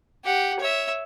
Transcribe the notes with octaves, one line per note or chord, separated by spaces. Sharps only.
G4 F#5
C#5 E5